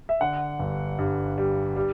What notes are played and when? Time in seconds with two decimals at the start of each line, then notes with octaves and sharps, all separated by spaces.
0.09 E5
0.21 D3 F#5
0.59 G1
0.99 G2
1.38 G3
1.76 G3